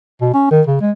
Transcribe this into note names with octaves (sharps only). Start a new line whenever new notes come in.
B2
C#4
D#3
C#3
G#3